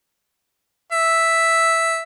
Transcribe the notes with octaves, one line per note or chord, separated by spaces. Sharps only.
E5